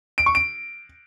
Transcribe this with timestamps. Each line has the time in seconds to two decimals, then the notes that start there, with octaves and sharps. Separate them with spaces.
0.18 D7
0.26 C#6
0.35 D7